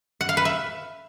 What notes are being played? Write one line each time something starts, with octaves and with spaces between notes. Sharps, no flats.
F#5
F5
B4
E5